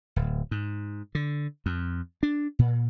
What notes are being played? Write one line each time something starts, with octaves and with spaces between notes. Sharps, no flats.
D1
G#2
D3
F2
D4
A#2